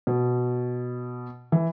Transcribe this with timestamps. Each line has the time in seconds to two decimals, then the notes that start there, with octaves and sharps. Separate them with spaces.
0.07 B2
1.52 E3